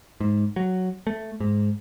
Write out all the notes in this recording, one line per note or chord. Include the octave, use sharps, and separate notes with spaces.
G#2
F#3
A3
G#2